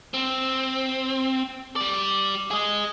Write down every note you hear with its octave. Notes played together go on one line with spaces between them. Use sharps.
C4
G3 D5
G#4 D#5